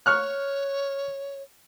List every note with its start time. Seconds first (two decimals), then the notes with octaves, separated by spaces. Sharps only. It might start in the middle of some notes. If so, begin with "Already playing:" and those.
0.06 C#5 C#6 F6 F#6